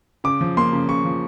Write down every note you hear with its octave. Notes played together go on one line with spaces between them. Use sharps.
C#3 D6
F3
A#3 C6
C#3
C#3 C#6
F3